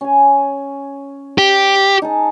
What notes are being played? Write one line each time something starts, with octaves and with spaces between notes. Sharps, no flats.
C#4 G#5
G4
D#4 G#4 A5